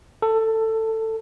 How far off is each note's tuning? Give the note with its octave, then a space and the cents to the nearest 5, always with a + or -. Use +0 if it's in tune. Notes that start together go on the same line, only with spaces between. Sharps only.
A4 +15